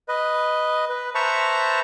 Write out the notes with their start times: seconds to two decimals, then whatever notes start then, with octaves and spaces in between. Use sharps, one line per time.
0.08 B4 D#5
0.89 B4
1.15 B4 C5 E5 A5 A#5 C#6